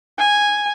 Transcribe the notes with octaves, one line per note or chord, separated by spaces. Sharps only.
G#5